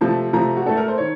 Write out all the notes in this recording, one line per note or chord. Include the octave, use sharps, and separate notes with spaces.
C3 F3 A3 A5
C3 F3 A3 A#5
F#4
A2 A3 A4
A#4
C5
D#3 C#5